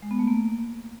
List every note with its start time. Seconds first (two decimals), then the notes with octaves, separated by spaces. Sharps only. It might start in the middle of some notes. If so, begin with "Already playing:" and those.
0.02 G#3
0.11 B3
0.19 A3
0.28 A#3